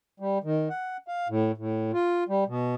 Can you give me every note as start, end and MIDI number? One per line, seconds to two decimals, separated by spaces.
0.20 0.38 55
0.44 0.69 51
0.70 0.97 78
1.08 1.28 77
1.29 1.52 45
1.57 1.92 45
1.93 2.24 65
2.29 2.44 55
2.48 2.75 47